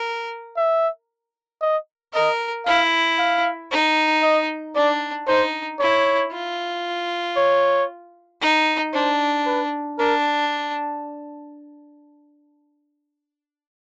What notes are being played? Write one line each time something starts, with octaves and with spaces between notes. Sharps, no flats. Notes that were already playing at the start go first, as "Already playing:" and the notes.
Already playing: A#4
E5
D#5
A#4 D#5
E4 F5
F5
D#4
D#5
D4 D5
D#4 C5
E4 C#5
F4
C#5
D#4
D4 C5
B4
D4 A#4